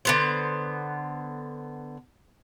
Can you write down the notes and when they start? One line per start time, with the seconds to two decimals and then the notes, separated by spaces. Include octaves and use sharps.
0.05 D3 B3 C5